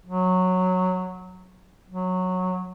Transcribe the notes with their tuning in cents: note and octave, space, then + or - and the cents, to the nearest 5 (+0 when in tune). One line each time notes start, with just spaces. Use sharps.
F#3 -10
F#3 -10